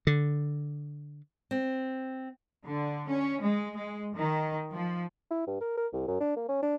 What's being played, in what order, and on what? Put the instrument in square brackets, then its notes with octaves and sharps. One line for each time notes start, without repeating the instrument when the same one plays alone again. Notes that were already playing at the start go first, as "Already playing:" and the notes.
[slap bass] D3
[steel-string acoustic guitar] C4
[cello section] D3
C#4
G#3
G#3
D#3
F3
[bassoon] E4
G2
A#4
A#4
C2
F#2
D4
A#3
C#4
D4